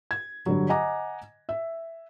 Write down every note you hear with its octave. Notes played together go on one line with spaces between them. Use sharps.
G#6
G2 D3 F#3
D#5 F#5 G#5 A#5 D6
E5